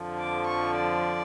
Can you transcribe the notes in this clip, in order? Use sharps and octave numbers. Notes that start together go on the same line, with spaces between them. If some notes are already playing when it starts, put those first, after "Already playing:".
Already playing: F2 D3 F3
D6
C#6
D5